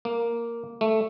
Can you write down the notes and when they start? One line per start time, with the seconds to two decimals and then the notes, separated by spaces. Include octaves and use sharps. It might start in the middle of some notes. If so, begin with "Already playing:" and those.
0.05 A#3
0.81 A3